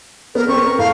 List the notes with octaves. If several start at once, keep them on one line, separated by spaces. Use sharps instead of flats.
B3 A#4
B3 C4 C#6
A#4
A2 F5